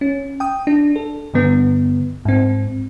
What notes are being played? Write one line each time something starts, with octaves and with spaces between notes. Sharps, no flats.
C#4
G5 D#6
D4
A4
G2 D3 B3
G#2 C4